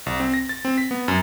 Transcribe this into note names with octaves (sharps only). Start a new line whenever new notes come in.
C2
C4
A#6
A6
C4
B6
B3
F#2